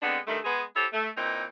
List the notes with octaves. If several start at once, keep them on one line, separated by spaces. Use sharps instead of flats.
D3 G#3 B3 C4 D4
G2 D#3 A3
G#3 B3 G#4
E4 G4 A4 C5 C#5
A3
A#2 E3 C4 D#4